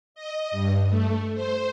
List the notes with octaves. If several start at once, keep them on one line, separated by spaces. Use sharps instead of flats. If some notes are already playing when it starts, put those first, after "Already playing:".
D#5
G2
A3
C5